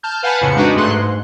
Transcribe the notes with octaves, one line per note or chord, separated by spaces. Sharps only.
A5 F6 G6
B4 F5 F#5 G#5 A5 B5
F2 A2 C#3 C#7
G#3 D4 D#4 F#4 B4
G2 A3 G#4 C6 F#6
G#2